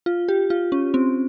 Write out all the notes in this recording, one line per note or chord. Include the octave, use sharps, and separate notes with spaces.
F4
G4
F4
C#4
C4